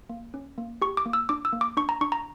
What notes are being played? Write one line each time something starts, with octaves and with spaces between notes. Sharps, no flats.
A#3
C#4
A#3
G4 C#6
D6
A#3
E6
D4 D6
E6
A#3
D6
D4 C#6
A#5
D4 C#6
A#5